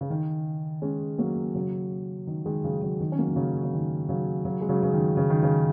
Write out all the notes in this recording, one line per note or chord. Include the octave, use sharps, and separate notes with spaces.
C#3
D#3
G#3 C#4
F#3 A#3
C#3 F#3
D#3
D#3 G#3
C#3 F#3
C#3 F#3
D#3
C#4
F#3 A#3
D#3
C#3 F#3
C#3
D#3
C#3 F#3
C#3 F#3
G#3
C#3 F#3
C#3
D#3
C#3
D#3
C#3